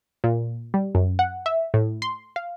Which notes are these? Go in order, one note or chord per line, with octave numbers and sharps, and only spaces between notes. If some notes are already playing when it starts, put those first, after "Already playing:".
A#2
G3
F#2
F#5
E5
A2
C6
F5